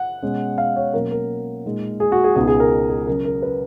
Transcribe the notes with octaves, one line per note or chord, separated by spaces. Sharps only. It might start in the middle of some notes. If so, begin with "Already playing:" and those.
Already playing: F#5
B2 G#3 C#4
F5
C#5
B2 F#3 A#3 C#4 A#4
A#4
A#2 G#3 D#4
G#4
F#4
G#4
C#2 B2 G#3 B3 D#4 G#4
G#4
A#4
G#4
C#3 F#3 C#4 A#4
A#4
B4